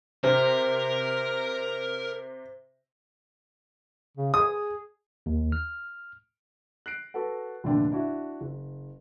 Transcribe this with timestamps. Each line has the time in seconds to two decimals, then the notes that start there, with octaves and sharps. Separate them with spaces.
0.24 C3 A#4 C5
4.17 C#3
4.34 G#4 D#6
5.26 D#2
5.52 F6
6.86 F#6 A#6 C7 D7
7.14 F#4 A4 B4 F#5
7.64 F1 A#2 D3 A3 D4 G5
7.92 D4 E4 F#4
8.41 F#1